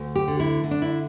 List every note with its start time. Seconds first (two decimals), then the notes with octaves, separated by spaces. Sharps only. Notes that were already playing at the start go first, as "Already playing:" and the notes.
Already playing: D2
0.15 G4
0.28 D3
0.40 E4
0.64 D3
0.71 D4
0.82 E4